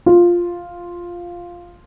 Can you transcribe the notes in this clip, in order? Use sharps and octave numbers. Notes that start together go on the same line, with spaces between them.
F4